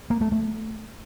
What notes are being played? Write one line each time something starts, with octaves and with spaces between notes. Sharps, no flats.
A#3
A3
A3